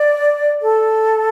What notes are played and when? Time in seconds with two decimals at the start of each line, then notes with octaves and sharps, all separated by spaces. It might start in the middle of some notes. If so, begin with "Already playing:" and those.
Already playing: D5
0.62 A4